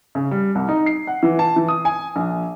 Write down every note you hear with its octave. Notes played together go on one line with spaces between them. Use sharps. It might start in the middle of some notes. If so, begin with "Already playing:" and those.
C#3
G3
C2
D#4
C7
F#5
E3
A5
E3
D#6
G#5
A#1